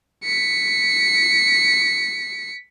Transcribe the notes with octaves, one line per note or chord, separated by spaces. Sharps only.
B6 C#7